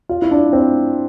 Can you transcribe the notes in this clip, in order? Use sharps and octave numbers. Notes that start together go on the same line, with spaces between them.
F4
E4
D4
C4